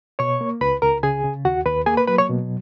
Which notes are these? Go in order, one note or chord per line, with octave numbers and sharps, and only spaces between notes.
B2 C#5 C#6
A#3
C#2 B4 B5
C#2 A#4 A#5
C#3 G#4 G#5
C#3
D#2 F#4 F#5
D#2 B4 B5
A#3 G#4 G#5
B4 B5
F#3 B4 B5
C#5 C#6
B2